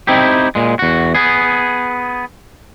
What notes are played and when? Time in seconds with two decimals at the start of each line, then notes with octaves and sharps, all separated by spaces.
0.07 C4 D#4 E4 G4
0.55 A#2 G#3
0.79 E2 F#4
1.15 B3 G#4